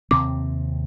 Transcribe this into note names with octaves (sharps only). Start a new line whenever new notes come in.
D#2 C3 C4 D6